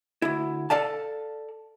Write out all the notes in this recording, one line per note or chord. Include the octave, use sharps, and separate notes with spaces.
D2 E4
A4 D5 F5 A5